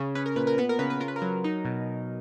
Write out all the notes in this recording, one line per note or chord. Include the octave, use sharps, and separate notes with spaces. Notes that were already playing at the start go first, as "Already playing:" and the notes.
Already playing: C#3
C#4 B4
A#4
A#2 B4
A#4
B3 B4
A#4
C#3 B4
B4
F4 A#4
B4
A#4
F#3
D#4
B2